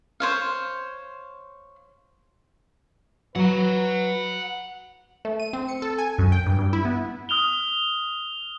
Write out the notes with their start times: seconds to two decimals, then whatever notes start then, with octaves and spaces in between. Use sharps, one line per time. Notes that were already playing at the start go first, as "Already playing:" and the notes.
0.20 C5 C#5 F5
3.36 F#3 B4 F#5 A#5
5.25 A3
5.40 D#7
5.53 C4
5.68 C#7
5.82 A4
5.98 G#5
6.18 F#2
6.32 G5
6.46 G2
6.59 G2
6.73 E4
6.85 B3
7.29 D#6 F6 F7 G7